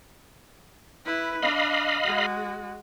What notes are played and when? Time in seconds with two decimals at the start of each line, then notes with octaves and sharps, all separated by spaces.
1.05 E4 B4
1.42 D4 D#5 F5 B5
2.05 G#3 F#4